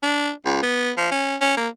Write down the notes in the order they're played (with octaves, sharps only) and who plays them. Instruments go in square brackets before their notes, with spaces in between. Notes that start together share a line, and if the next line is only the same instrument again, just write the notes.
[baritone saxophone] D4
C#2
B3
F3
C#4
C#4
A#3